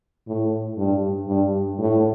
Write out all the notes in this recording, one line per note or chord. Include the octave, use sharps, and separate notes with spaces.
A2
G2
G2
A2